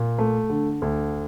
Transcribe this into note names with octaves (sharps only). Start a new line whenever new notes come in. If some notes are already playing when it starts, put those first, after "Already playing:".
Already playing: A#2
A3
D3
D2